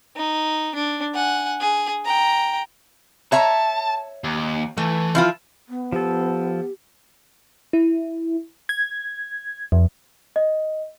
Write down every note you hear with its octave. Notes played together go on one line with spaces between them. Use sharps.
D#4
D4
F#5 G#5
G#4
G5 A#5
C#5 E5 A5 A#5
D#2
E3 A3
F3 E4 F4
B3
F3 G4 A4
E4
G#6
F2
D#5